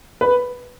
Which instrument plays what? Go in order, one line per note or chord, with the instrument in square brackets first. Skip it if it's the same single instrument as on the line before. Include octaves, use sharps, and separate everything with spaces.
[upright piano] B4